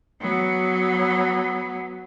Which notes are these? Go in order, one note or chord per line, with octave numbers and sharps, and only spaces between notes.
F#3 B3